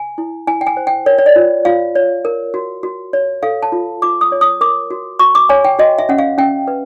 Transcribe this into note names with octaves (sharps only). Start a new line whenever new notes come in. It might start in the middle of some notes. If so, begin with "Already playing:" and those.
Already playing: G#5
E4
E4 G#5
G5
G#5
C5
G5
A#4 C#5
C#5
D5
F4
F4 F5
C#5
A#4
F#4
F#4
C#5
A4 F5
A5
F4
F4 D6
D#6
C#5
D#6
A#4 D6
F#4
F#4 C#6
D6
C#5 G#5
G5
F#4 D#5
E5
C#4 F#5
F5
C#4 G5
B4